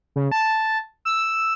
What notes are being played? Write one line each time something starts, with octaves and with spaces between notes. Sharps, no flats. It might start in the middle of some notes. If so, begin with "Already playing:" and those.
C#3
A5
E6